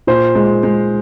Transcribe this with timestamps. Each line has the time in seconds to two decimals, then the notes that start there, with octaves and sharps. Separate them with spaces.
0.07 A#2 C5
0.35 G#3
0.63 G#3